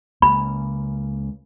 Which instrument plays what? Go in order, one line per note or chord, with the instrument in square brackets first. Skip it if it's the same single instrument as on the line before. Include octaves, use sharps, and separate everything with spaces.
[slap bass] C#2 C#3 A#3 [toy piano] B5